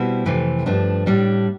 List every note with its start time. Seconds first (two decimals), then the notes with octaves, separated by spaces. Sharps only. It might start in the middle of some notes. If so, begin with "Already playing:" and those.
Already playing: B2 G3 C4 E4
0.26 F2 C3 E3 A3
0.66 G2 F3 A3 D4
1.06 A2 G3 D4